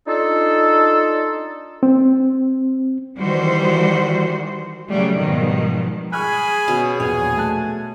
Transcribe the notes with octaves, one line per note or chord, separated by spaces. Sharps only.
D4 D#4 F4 A4
C4
D#3 E3 G3 F#4 C5
C#3 F#3 G3 A3
G#2 B2 D#3 F3 G3
G#4 G#5 B5 C#6 F6 F#6
B2 C#4
A#1 E2 C#5 G#5
A3 A5 F#6